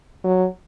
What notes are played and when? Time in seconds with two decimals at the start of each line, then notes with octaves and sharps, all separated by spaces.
0.24 F#3